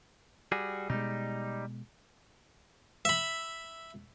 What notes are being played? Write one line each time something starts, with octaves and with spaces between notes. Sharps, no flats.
G3 F#4 G#4
B2 G3 G#3 D#4
E5 B5